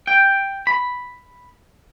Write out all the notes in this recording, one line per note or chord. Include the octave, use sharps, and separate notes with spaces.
G5
B5